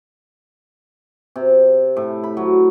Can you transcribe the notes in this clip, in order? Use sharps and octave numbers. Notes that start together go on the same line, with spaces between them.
C3
A2
B5
F#3